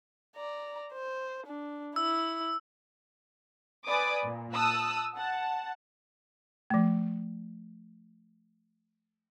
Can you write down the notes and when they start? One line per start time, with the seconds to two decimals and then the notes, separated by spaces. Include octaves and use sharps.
0.36 D5 A#5
0.93 C5
1.47 D4
1.96 E4 E6
3.88 B4 D5 G#5 B5 D6 D#6
4.24 A#2
4.53 A5 D#6 E6 F#6
5.16 F#5 A5
6.70 F3 A3